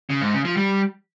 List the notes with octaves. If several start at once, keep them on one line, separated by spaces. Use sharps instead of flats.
C#3
G#2
C#3
F3
G3